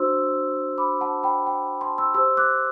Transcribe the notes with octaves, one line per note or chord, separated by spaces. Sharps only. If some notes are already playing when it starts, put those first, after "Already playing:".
Already playing: D4 F#4 C5 C6 E6
B5 D6
F#5 A5
G5 B5
G5
A5 C6
C6 E6
G4 C5 C6 E6
D6 F#6